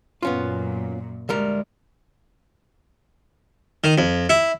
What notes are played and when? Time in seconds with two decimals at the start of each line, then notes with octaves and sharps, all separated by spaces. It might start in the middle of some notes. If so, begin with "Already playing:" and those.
0.23 F#2 A#2 B3 C#4 F4
1.29 D2 G3 G#3 A#4
3.84 D#3
3.98 F2
4.30 E4